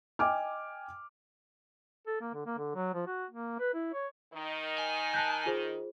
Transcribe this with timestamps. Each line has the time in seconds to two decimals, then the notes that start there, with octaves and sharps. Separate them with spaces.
0.19 D#5 G5 G#5 D6 F6
2.07 A4
2.21 A#3
2.34 D3
2.46 A#3
2.58 D3
2.76 F#3
2.94 F3
3.07 F#4
3.30 A#3
3.59 B4
3.74 E4
3.93 C#5
4.34 D#3 D#4
4.78 G#5
5.14 A5 F#6 G6
5.46 F4 G#4 C5